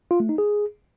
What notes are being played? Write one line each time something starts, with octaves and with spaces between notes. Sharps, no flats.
F4
A3
D#4
G#4